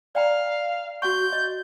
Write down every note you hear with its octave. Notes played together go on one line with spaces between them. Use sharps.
D5 F5 G5 A#5
F#4 F#5 C#6 G6
D#5